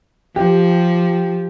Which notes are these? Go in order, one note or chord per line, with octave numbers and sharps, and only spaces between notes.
F3 G4